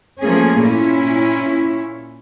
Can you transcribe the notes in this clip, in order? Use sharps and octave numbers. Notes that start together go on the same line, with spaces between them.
F3 A3 A#3 C#4 G#4
A#2 C#4 E4